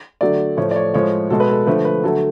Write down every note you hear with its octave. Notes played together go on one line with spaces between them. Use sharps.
D3 F#3 A3 D5
A2 F3 A3 C#5
D5
C#5
A2 F3 G#3 C#5
B2 G#3 A4
B4
A4
D3 F3 A3 B4
B4
D3 F#3 A3 A4